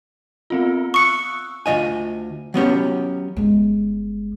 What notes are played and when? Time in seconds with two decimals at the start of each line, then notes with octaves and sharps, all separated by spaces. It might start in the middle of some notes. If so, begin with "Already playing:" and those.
0.50 B3 C4 F4
0.94 C#6 D#6 E6 F#6 C#7
1.66 D2 C#3 F4 D#5 G#5
2.54 F#3 B3 C#4 G4
3.37 G1 G#3